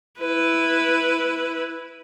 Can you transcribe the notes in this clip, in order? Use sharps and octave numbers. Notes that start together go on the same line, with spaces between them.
E4 B4